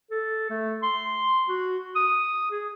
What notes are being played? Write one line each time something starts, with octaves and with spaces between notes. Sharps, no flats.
A4
A3
C6
F#4
D#6
G#4